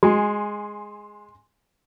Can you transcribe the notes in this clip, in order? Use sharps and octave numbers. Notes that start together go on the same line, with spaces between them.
G#3 F#4 G#5 C6